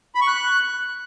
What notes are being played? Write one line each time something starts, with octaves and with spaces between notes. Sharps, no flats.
B5
C#6
F#6